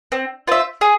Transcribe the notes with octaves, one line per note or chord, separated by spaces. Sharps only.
C4
F4 C5 E5
G#4